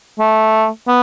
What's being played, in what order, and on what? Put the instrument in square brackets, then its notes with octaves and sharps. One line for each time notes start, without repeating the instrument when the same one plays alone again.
[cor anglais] A3
B3